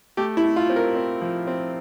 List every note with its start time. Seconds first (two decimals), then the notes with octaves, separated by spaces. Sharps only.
0.17 A3 G4
0.37 E4
0.43 A3
0.56 F4
0.69 C4
0.76 A#4
0.95 C4
1.21 F3
1.47 C4